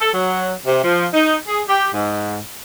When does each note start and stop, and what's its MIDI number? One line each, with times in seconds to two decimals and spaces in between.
0.01 0.10 69
0.14 0.52 54
0.66 0.82 48
0.83 1.05 53
1.14 1.36 63
1.47 1.61 68
1.68 1.89 67
1.94 2.37 44